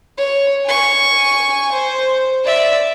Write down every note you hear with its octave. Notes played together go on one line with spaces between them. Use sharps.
C#5
G#5 C#6
C5
D5 E5